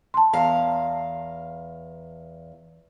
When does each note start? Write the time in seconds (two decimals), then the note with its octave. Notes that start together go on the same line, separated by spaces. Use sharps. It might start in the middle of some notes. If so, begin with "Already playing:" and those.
0.14 A5 C6
0.33 E2 F5 A#5